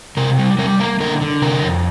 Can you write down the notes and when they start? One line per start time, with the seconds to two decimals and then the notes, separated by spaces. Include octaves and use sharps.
0.17 C3 A#4
0.38 G3
0.58 G3 A#4
0.80 A#3 A#4
1.00 D3 A#4
1.21 D3
1.42 C3 A#4
1.62 F2